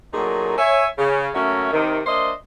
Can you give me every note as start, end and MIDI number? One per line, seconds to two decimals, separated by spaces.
0.14 0.56 46
0.14 0.56 54
0.14 0.56 57
0.14 0.56 58
0.14 0.56 63
0.14 0.56 68
0.58 0.86 73
0.58 0.86 76
0.58 0.86 80
0.98 1.28 49
1.34 1.71 54
1.34 1.71 57
1.34 1.71 58
1.34 1.71 61
1.34 1.71 66
1.34 1.71 76
1.73 2.00 48
1.73 2.00 51
2.06 2.31 58
2.06 2.31 62
2.06 2.31 72
2.06 2.31 75
2.06 2.31 76
2.06 2.31 84